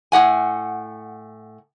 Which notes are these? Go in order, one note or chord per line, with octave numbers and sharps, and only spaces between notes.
A2 G4 F#5 G#5